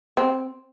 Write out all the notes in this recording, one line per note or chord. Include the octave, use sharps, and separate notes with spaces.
C4